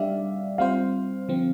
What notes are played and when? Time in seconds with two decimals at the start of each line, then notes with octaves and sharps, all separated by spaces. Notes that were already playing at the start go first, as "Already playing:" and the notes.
Already playing: G3 D4 G4 D5 E5 F5
0.58 G3 C4 F4 C5 F5
1.29 D3 F3 C4